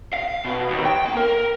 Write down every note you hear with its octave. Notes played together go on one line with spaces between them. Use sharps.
F5
B2
D#2
G5
A#3
A#4